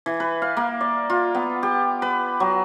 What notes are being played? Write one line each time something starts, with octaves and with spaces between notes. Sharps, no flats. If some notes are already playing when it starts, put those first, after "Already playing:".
E3
B4
F5
A#3
D5
F4
B3
G4
B4
F#3